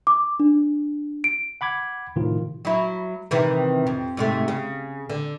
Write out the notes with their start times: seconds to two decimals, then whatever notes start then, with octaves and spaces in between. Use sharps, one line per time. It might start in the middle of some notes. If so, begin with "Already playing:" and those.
0.07 D6
0.40 D4
1.24 D7
1.61 F#5 B5 D6 G#6
2.16 A2 C3 D#3 F3 F4
2.65 F#3 E4
3.31 C3 D#3 E3
3.87 F2
4.17 G#2 C3 A3
4.48 C#3
5.10 D3